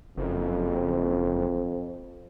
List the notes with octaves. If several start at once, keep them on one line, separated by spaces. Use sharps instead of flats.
F#1 F2